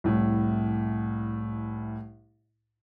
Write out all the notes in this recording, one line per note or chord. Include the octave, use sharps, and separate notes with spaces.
C2 A2